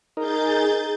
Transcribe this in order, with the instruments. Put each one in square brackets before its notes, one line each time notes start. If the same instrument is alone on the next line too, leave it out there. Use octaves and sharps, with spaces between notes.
[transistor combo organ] D#4 A#4 [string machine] G#4 G6 A6